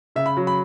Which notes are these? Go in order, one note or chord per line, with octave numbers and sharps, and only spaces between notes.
C#3 E5
B5
F#3
B5